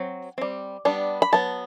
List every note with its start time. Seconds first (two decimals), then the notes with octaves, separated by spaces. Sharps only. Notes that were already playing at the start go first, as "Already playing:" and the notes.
Already playing: F#3 C4
0.38 G3 C4
0.85 G3 B3 D4
1.22 B5
1.32 F#3 B3 A5